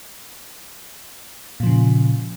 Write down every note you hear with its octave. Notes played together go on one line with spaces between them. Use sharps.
A#2 C#3 F3